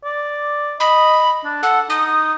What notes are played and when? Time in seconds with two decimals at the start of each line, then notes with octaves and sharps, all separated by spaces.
0.04 D5
0.80 D#5 B5
1.45 D4
1.63 A4 F#5
1.90 D#4 D#6